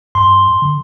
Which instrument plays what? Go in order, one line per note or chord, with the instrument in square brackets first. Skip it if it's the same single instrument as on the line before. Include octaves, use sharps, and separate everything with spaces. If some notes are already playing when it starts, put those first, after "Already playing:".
[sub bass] G2 [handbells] C6
[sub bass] D3